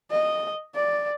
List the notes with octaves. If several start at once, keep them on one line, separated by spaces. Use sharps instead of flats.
D#5
D5